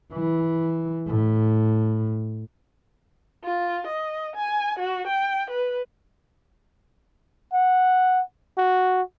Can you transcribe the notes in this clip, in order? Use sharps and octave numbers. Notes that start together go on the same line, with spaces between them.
E3
A2
F4
D#5
G#5
F#4
G5
B4
F#5
F#4